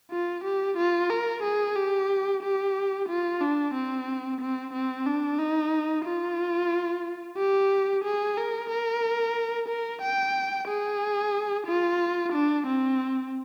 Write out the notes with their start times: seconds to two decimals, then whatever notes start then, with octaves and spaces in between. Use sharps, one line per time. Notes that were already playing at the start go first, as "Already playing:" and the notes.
0.11 F4
0.44 G4
0.77 F4
1.10 A#4
1.43 G#4
1.76 G4
2.43 G4
3.08 F4
3.41 D4
3.74 C4
4.41 C4
4.73 C4
5.06 D4
5.39 D#4
6.05 F4
7.37 G4
8.04 G#4
8.37 A#4
8.70 A#4
9.68 A#4
10.02 G5
10.68 G#4
11.67 F4
12.32 D4
12.66 C4